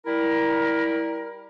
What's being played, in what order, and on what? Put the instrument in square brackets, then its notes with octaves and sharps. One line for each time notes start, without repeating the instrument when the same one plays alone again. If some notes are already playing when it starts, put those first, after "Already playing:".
[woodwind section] G3 E4 A#4